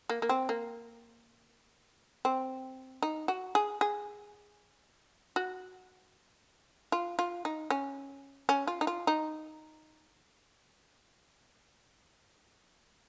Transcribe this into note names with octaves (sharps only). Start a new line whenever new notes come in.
A#3
A#3
C4
A#3
C4
D#4
F#4
G#4
G#4
F#4
F4
F4
D#4
C#4
C#4
F4
D#4
F4
D#4